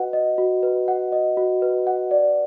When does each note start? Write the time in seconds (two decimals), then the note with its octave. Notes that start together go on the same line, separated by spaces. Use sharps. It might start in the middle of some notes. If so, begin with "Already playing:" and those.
Already playing: F#4 B4 D#5 F#5
0.13 D#5
0.38 F#4
0.63 B4
0.88 F#5
1.12 D#5
1.37 F#4
1.62 B4
1.87 F#5
2.11 D5